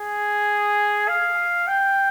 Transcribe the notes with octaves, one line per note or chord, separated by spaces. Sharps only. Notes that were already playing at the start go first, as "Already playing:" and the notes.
Already playing: G#4
F5
G5